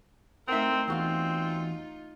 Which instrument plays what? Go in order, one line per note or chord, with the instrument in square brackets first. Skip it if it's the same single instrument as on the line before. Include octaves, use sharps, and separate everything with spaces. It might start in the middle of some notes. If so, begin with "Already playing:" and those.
[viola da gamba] A3 D#4 A#4 [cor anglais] C4 [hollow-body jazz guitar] E5 F#5
[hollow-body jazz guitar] E2 F#4 F5 [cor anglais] C4 [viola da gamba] D#4 F4